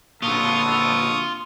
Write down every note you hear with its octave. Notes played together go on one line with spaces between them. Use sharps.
A#2 D3 B3 F4 A4 C#6 D#6